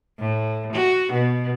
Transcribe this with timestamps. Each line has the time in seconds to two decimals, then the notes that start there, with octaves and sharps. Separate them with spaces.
0.19 A2
0.73 F#4
1.12 B2